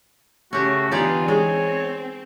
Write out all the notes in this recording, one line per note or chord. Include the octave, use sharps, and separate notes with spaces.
C#3 A3 C#4 F#4 G4
D3 E3 B3 D#4 F4 G4 D5 G#5
G#3 C4 C#5